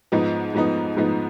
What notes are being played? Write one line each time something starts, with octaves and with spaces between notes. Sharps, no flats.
G#2 F3 B3 D#4
G#2 F3 B3 D#4
G#2 F3 B3 D#4